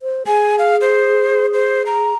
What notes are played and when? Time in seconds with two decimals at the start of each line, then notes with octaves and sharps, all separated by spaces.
0.02 C5
0.27 G#4 G#5
0.59 F5
0.81 C5
1.53 C5
1.86 A#5